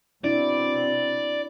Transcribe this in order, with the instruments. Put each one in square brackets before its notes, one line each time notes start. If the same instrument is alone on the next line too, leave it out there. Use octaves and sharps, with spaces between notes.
[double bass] B2 C4 [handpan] D4 E4 [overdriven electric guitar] D5